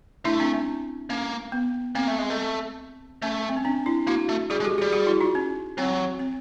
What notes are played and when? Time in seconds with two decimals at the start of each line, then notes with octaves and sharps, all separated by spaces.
0.25 A3 D4 E4
0.40 C4 D4
0.53 C#4
1.10 A#3 C#4
1.52 B3
1.95 A#3 C4
2.08 A3
2.19 G#3
2.30 A3
3.22 A3 C#4
3.49 C4
3.57 C#4
3.65 C4 D4
3.86 D4 E4
4.07 A#3 E4 F#4
4.29 A3
4.50 G3 F#4 G#4
4.60 G#3
4.64 G4 A4
4.78 F#4 G#4
4.82 G3
4.92 F#4 G#4
5.07 E4 F#4
5.21 D#4 F4
5.35 C#4
5.78 F#3 C4
6.19 C4